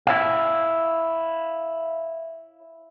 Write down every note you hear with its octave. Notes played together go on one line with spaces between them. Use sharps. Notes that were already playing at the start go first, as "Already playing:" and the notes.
E4 C#5 F5